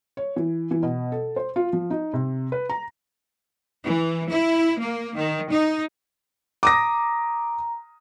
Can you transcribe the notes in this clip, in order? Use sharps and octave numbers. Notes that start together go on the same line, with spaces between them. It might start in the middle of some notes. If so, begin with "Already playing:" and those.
C#5
E3
E3
B2
A4
C5
F4
F3
D#4
C3
B4
A#5
E3
E4
A#3
D#3
D#4
A#5 D6 D#6 A#6